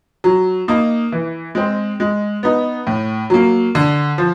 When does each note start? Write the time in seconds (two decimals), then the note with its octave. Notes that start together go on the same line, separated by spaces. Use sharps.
0.24 F#3
0.68 A#3 D#4
1.12 E3
1.55 G#3 C4
2.00 G#3
2.43 B3 D#4
2.87 A2
3.30 F#3 A#3
3.75 D3
4.18 F3